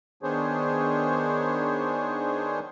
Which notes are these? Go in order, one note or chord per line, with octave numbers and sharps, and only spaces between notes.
D#3 B3 D4 G#4 C5 C#5